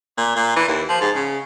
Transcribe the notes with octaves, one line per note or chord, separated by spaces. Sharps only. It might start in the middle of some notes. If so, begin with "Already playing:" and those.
A#2
A#2
E3
D#2
F3
G#2
C#3